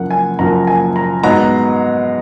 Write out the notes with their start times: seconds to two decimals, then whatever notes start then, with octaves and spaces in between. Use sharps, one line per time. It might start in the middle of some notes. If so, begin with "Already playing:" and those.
Already playing: F#1 F#2 F3 A#3 F#5
0.11 G#5
0.39 F#1 F#2 F3 A#3 A#5
0.67 G#5
0.96 A#5
1.23 G#2 F#3 B3 A#5